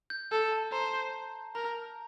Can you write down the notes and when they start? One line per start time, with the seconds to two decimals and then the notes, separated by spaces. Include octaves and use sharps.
0.10 G6
0.32 A4 G6
0.52 A5
0.72 C5 A#5
1.55 A#4 A#5